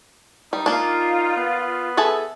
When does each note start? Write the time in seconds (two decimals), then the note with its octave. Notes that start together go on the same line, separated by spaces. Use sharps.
0.53 G3 D#4
0.66 A#3 D4 F4
1.37 B3
1.97 G#4 A4 E5